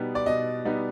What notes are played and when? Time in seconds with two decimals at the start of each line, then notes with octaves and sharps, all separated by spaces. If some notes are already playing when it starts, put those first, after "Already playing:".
Already playing: B2 G3 B3 D#4
0.15 D5
0.26 B2 D#5
0.65 G3 B3 D#4